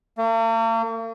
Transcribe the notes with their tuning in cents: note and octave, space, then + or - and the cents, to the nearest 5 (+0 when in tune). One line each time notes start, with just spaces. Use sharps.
A#3 -45